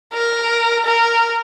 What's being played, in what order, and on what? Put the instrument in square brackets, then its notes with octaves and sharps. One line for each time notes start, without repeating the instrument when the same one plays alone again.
[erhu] A#4
A#4